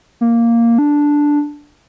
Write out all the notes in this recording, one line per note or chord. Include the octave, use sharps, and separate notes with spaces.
A#3
D4